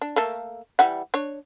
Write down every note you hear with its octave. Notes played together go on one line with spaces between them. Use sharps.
D4
A3 A#3 A4
E3 G3 F#5
D4 C#5